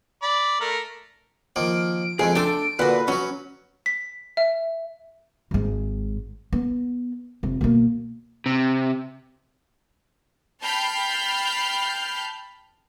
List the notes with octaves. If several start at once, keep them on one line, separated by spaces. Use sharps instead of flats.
D5 B5
A3 A#4
D#3 F3 A#3 D7
F2 G#3 A3 G#4
A3 D4 A4 G5 C6
A#2 D3 F#4 B4 F#5
F#3 C#4 F#4
B6
E5
G#1 G#2
B3
F1 C3
B2 A#3
C3
G5 A5 B5 F6 G6 C7